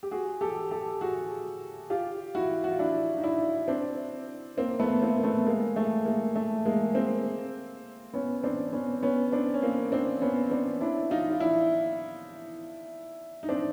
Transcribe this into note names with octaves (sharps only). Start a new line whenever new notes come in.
G4
F#4 G#4
G4 A4
G4 A4
F#4 G#4
F4 G4
E4 F#4
F#4
F4
D4 E4
D#4
D4 E4
C4 D4
A#3 C4
A3 B3
A#3 C4
A#3
A3 B3
G#3 A#3
A3
G#3 A#3
A3
G#3 A#3
A#3 C4
B3 C#4
C4 D4
B3 C#4
B3 C#4
C4 D4
C#4
A#3 C4
C4 D4
B3 C#4
C4 D4
D4 E4
D#4 F4
F4
D4 E4
D#4
C4 D4